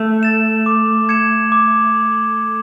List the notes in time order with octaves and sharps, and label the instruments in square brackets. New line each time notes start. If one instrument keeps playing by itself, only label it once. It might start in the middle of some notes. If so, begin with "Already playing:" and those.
Already playing: [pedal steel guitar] A3
[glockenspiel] A6 E7
D6
G#6 C#7 E7
D6